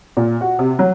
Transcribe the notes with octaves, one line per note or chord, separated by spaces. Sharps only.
A#2
F#4
C3
F#3